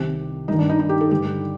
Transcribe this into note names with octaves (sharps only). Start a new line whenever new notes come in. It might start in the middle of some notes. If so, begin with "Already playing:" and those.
Already playing: C2 C3 D#3 G4
G2 D#3 D#4
D4
D#4
D#4
G4
A4
G2 D3 G4